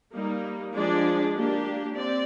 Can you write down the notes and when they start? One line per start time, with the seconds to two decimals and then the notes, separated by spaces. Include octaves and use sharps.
0.14 G3 A#3 D#4
0.74 F3 G#3 D4 G#4 D5
1.35 A#3 D4 G4
1.95 C4 D5